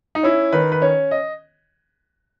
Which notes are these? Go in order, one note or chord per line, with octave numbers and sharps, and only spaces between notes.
D#4
C#4 E4
D#3 B4
B4
C#4 C#5
D#5